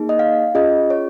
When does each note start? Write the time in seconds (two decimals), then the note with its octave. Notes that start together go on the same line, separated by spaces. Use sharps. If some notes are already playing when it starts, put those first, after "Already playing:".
Already playing: A#3 D#4 G#4
0.09 D#5
0.19 F5
0.55 C#4 F4 G#4 D#5
0.90 C#5